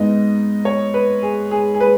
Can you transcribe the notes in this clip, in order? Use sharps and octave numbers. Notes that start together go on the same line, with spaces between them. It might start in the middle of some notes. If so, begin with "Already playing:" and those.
Already playing: G#2 G#3 B3 D#4 D#5
C#5
B4
G#4
G#4
G#4
B4